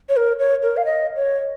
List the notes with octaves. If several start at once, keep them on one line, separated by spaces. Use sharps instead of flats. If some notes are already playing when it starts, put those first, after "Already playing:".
C#5
A#4
C#5
A#4
F5
D#5
C#5